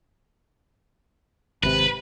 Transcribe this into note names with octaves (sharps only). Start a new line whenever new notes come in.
G#1 C3 B4